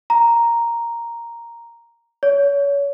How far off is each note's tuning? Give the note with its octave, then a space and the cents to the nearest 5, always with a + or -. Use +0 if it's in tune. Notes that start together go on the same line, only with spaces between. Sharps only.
A#5 +0
C#5 +30